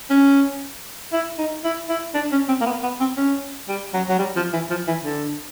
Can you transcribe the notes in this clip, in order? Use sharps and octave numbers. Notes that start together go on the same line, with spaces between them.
C#4
E4
D#4
E4
E4
D4
C#4
C4
A#3
B3
B3
C4
C#4
G3
F#3
F#3
G3
F3
E3
F3
E3
D3